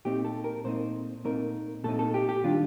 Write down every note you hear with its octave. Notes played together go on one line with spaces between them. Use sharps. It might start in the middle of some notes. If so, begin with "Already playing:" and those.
A#2 A3 C4 D#4 G4
A4
A#4
A#2 A3 C4 D#4 C5
A#2 A3 C4 D#4 A#4
A#2 A3 C4 D#4 A4
A4
G4
G4
D#3 G3 D4 F4